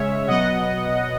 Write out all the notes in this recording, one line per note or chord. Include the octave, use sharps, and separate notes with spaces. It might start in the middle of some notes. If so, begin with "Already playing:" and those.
Already playing: C#3 G#3 C#4 C#5 E5
B2 F#3 B3 D#5 F#5